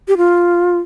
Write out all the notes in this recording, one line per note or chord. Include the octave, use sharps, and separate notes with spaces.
G4
F4